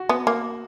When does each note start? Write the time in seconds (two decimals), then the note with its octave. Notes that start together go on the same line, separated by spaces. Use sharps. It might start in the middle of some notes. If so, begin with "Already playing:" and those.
Already playing: F#4
0.09 B3
0.27 A#3